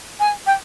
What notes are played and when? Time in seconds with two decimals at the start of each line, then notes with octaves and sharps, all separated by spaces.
0.20 G#5
0.47 G5